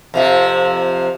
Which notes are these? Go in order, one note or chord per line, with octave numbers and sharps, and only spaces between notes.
F2 C3 F3